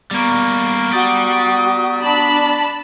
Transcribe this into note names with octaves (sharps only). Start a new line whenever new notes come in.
G3 A#3 B3 A#5 C#6
F#4 G4 D5 D#6
D4 A5 B5